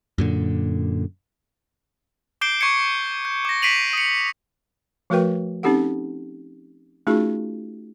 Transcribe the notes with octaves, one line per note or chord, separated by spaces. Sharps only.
F#2 A#2 D3
D6 G6 C7 D7 G7
C#6 D6 G#6 C7 C#7
G6
D6 A#6
B6 C7 D7 D#7 F7 F#7
D#6 C#7
F3 A3 F#4 A#4 B4 G5
C4 C#4 D#4 G4 A4 F#5
A3 C#4 D#4 F4 F#4 G#4